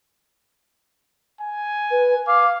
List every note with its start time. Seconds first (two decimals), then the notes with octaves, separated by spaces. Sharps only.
1.41 G#5
1.91 B4
2.27 F5 D6